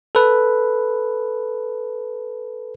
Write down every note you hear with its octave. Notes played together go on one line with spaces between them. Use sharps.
A4 B4